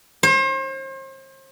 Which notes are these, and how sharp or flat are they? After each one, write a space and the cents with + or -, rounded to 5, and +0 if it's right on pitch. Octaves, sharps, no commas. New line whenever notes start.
C5 +40